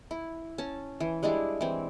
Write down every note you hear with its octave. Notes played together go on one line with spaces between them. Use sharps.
E4
C#4 A5
E3
G3 G#3 D4 E4
E3 C4